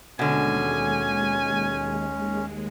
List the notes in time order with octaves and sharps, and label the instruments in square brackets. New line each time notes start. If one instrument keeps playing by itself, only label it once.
[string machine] D#2 G#3 [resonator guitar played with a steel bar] B2 D3 [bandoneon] C#4 [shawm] G#5